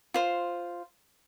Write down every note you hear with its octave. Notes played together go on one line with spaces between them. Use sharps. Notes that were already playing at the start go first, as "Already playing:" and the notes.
F4 C5